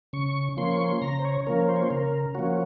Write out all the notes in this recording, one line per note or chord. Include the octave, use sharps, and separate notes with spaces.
C#3 C#6
F3 A#3 C#4 C6
C#6
C6
C#3 A#5
C5
C#5
F3 A#3 C#4 A#4
C5
C#5
C5
C#3 A#4
F3 A#3 C#4 F#4